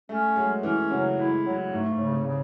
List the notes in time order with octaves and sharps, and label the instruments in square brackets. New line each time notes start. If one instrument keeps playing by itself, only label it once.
[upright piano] A3 [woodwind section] C#4
[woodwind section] F#3 [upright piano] G#3
[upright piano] E3 [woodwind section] C#4
[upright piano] C#3 [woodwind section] F#3
[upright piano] G#3 [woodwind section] E4
[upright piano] C#3 [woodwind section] F#3
[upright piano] G#2 [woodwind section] A3
[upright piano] G#2
[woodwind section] C#3
[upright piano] C3
[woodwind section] C#3